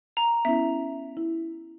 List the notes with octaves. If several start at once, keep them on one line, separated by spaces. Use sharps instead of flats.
A#5
B3 C#4 E4 E5
E4